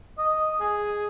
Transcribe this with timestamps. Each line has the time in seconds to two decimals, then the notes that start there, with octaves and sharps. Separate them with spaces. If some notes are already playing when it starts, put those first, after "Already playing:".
0.18 D#5
0.60 G#4